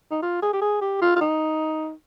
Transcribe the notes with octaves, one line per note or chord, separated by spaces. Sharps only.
D#4
F4
G#4
G4
G#4
G4
F4
F4
D#4